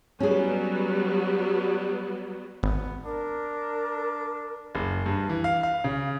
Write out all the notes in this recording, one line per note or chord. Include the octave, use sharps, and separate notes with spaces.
F#3 G3 B3 C#4 G#4
G#1 B3
D4 A#4
F#1
G2
E3
F5
F5
C#3